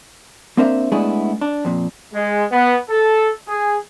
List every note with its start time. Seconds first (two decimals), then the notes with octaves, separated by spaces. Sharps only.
0.57 A#3 C4 D4 A#4 C5 E5
0.92 G#3 A3 B3 D4 E4 G#4
1.41 D4
1.65 F2 A#2
2.13 G#3
2.52 B3
2.90 A4
3.48 G#4